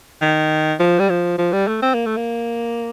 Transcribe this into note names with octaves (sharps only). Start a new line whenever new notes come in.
D#3
F3
G3
F3
F3
G3
A3
C4
A#3
A3
A#3